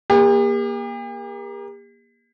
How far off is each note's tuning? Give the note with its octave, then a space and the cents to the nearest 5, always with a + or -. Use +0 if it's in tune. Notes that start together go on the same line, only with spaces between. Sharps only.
A#3 +20 G4 +45